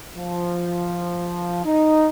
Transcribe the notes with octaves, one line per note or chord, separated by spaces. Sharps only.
F3
D#4